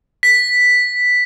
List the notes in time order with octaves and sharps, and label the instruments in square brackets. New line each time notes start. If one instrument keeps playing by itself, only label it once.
[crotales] B6